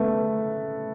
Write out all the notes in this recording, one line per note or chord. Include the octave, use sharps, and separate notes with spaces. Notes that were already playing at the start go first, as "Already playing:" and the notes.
Already playing: A3 B3